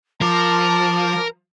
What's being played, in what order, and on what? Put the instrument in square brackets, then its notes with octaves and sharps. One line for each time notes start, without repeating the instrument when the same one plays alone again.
[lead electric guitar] F3 [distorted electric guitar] A#4 [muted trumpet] A5 [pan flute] D6